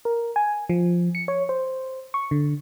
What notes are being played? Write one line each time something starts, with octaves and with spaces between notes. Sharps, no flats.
A#4
G#5
F3
C#7
C#5
C5
C#6
D3